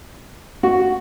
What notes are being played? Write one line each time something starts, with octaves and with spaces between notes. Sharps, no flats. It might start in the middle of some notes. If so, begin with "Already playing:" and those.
F#4